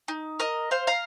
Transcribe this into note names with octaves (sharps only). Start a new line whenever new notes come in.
D#4
A#4 D#5
C5 F5
F5 A#5